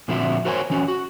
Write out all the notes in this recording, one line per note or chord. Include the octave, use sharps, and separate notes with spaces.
A#2 D3 F3 C4 F#4 E5
F#4 A#4 C5 C#5 D#5 G#5
E3 C#4 F#4
F#4